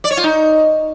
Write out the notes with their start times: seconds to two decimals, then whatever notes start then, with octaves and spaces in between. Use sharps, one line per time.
0.04 D5
0.11 C#5
0.17 F4
0.24 D#4